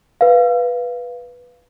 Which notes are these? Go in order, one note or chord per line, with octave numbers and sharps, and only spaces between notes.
B4 F5